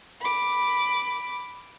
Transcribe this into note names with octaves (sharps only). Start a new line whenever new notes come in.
B5 D6